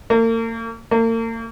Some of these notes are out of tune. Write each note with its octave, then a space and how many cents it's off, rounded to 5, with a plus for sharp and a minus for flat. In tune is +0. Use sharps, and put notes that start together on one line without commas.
A#3 -40
A#3 -40